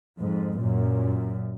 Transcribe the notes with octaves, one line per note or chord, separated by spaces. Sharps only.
F2 G#2
F#2 A#2